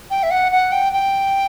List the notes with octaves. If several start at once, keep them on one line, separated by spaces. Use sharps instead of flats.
G5
E5
F#5
F#5
G5
G5